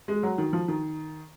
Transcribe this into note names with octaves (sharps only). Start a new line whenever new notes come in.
G#3
F#3
D#3
F3
D#3